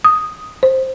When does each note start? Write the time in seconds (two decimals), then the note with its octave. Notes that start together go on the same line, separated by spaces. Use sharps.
0.04 D#6
0.63 C5